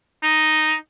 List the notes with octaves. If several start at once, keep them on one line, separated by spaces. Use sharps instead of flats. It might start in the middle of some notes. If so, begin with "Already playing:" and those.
D#4